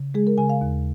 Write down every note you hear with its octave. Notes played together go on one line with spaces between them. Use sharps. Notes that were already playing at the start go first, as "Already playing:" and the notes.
Already playing: C#3
G#3 G#4
A#4
C#3 G#5
F5
D#2